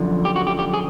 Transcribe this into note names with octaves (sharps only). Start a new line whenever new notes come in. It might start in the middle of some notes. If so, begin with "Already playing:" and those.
Already playing: F#2 D3 F3
G4
F#4
G4
G4
G#4